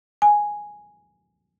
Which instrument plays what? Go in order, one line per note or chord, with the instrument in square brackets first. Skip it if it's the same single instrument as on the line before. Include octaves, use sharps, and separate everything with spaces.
[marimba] G#5